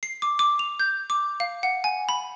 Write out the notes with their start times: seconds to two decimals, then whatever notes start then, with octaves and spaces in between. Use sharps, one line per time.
0.03 C7
0.22 D6
0.39 D6
0.59 F7
0.80 G6
1.10 D6
1.40 F5
1.63 F#5
1.84 G#5
2.09 B5